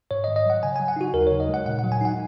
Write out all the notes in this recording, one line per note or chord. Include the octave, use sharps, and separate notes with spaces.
G#2 C#5
D#5
D#3
D#5
F#3 F#5
C#3 G#5
F#3 G#5
F#5
D#4 F#4
D#2 A#4
C#3 C#5
D#5
G#3
F#5
A#2 F#5
F#5
F#3
G#5
D#4 F#5